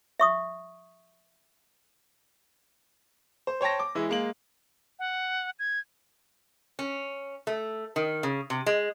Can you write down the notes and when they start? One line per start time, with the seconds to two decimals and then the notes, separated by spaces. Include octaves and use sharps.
0.20 E5 C#6 D#6
3.47 C5
3.61 C5 C#5 G5 A5 A#6
3.79 D6
3.95 E3 G#3 E4
4.09 G#3 A#3 F#7
4.99 F#5
5.59 G#6
6.79 C#4
7.47 A3
7.96 D#3
8.23 C#3
8.50 C3
8.66 G#3